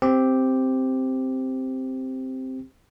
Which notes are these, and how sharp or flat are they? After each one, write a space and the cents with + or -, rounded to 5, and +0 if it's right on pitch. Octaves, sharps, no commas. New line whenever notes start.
C4 +0 G4 +0